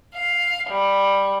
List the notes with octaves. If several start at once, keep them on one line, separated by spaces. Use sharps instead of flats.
F5
G3